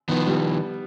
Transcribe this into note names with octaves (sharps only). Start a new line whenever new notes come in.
D#3 F3 B3
G3